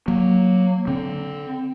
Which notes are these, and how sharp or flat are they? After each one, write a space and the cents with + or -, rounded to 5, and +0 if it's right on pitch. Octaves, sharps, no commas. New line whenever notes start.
F#3 +0 A#3 +5
D3 -15 C4 +0